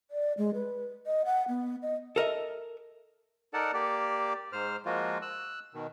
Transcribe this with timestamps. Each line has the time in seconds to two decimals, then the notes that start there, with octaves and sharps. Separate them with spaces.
0.11 D5
0.38 G#3
0.54 B4
1.06 D#5
1.25 F#5
1.49 B3
1.82 D#5
2.16 A4 A#4 D#5 E5
3.54 D#4 A4 A#4 D5 F#5 A5
3.74 A#3 G4 D5
4.52 G#2 C5 F6
4.85 F3 G#3 A#3 F4 F#4
5.22 E6 F#6
5.74 B2 D#3